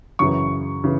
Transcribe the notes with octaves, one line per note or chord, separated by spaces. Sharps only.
F#2 C#3 E3 C#6
C#3 E3